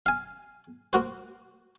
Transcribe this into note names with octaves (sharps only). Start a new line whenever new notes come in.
F5 G#5
A#3 F#4 C5